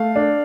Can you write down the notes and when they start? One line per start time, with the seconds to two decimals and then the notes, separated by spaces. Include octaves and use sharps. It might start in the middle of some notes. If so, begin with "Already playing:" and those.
Already playing: A3 F5
0.16 D4